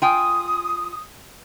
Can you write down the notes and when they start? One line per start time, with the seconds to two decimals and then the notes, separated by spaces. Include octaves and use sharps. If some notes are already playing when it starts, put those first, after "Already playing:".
0.02 F4 G5 G#5 D#6